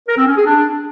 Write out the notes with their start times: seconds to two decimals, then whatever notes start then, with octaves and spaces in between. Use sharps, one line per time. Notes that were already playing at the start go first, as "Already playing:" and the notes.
0.08 A#4
0.17 C4
0.27 C#4
0.36 G#4
0.45 D4